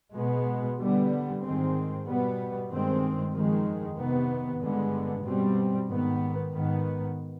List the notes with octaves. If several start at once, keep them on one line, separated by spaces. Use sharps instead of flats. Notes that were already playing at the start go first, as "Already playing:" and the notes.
B2 G#3 B3
D3 G3 B3
G#2 D#3 G#3 C4
B2 G3 B3
G2 D#3 G#3 C4
F2 D#3 G#3
C3 D#3 B3
G2 D3 G#3 B3
B2 G3 C4
G#2 D#3 B3
G#2 D#3 B3